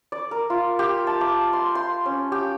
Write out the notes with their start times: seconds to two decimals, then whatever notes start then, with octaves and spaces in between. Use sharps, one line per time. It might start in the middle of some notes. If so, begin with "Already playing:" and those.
0.12 D5
0.31 A#4
0.50 F4
0.79 G4
1.07 A5
1.21 D6
1.53 C6
1.75 C6
2.06 C#4
2.32 G4